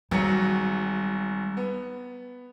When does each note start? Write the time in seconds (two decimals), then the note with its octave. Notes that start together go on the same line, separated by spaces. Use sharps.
0.11 G#1 F#3 G3 C#7
1.57 B3